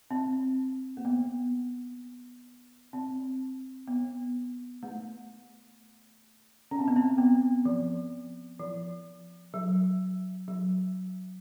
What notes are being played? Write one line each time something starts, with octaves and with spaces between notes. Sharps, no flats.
C4
A#3
B3
C4
B3
A3
C#4
C4
B3
C4
B3
F3
F3
F#3
F#3